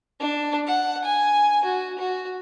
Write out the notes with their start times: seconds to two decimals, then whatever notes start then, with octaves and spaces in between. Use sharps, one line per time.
0.20 D4
0.67 F#5
1.04 G#5
1.64 F#4
1.98 F#4